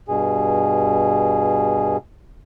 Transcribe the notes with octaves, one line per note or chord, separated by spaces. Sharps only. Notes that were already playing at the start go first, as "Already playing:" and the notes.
G2 B2 G#4